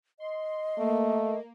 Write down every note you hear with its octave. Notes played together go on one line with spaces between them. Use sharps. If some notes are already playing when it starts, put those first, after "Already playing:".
D#5 C6
A3 A#3